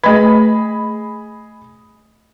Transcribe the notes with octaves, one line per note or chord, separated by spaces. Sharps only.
A3 G#4 B4 D#5 B5